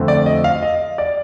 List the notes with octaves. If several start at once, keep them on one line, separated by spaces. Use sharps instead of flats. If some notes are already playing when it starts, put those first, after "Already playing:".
Already playing: F2 D3 A3 C4
D5
D#5
F5
D#5
D5